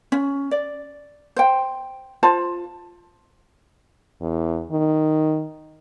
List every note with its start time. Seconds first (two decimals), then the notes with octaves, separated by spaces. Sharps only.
0.12 C#4
0.51 D5
1.36 C5 G5
2.23 F4 C5 A5
4.21 E2
4.71 D#3